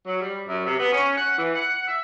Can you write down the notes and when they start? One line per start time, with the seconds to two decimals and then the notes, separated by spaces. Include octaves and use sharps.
0.06 F#3
0.21 G3
0.48 F#2
0.66 C3
0.79 B3
0.92 C#4
1.17 F#5
1.38 E3
1.55 F#5
1.87 E5